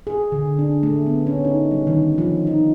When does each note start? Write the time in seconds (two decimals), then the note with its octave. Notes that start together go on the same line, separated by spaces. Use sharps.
0.07 G#4
0.32 D3
0.59 D4
0.83 A3
1.06 B3
1.27 C#4
1.45 D#4
1.71 G3
1.87 D#3
2.18 F3
2.47 D#4